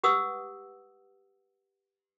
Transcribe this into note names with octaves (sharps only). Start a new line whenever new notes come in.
G4 B4 F#5 D#6 E6